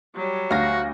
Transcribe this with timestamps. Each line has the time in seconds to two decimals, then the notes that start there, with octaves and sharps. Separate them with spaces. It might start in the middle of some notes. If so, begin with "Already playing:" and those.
0.16 F#3 G3
0.51 D2 F#4 F5 A#6